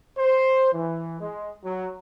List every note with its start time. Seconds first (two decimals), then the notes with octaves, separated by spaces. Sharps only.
0.16 C5
0.72 E3
1.20 G#3
1.63 F#3